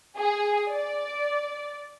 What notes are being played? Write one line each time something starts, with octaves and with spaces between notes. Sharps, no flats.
G#4
D5